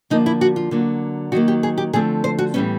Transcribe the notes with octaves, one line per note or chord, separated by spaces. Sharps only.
D3 F3 A#3 D#4
E4
F#4
F4
D3 F#3 A#3
D#3 F#3 A#3 F#4
G4
G#4
G4
D3 F3 A3 C4 G#4
C5
F#4
A2 E3 G3 B3 C#4